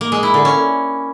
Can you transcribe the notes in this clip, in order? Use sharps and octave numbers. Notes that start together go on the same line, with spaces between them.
A#3
G#3
E4
D3
C#4